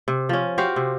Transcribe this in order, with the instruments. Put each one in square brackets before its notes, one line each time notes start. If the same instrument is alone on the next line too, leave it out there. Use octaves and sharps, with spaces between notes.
[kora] C3
F3 C#4
F#4 G4 C5 F5
C3